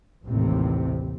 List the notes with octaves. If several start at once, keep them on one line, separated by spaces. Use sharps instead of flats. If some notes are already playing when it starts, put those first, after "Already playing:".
A1 D#2 A2 C3